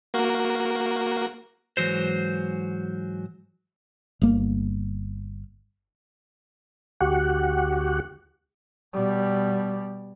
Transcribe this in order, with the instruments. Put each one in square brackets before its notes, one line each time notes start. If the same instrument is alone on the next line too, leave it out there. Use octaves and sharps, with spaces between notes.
[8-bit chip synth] A#3 F#4 A#4
[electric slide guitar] G#2 E3 F#3 C5
[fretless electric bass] G1 A#3
[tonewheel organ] D2 F#4 G4 F#5
[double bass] B2 G3